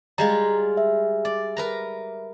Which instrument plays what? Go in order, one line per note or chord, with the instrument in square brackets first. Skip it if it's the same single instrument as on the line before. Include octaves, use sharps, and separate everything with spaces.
[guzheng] G3 G#3 F4 [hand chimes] A#5
[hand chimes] E5
[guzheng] D5
A#4 B4 A#5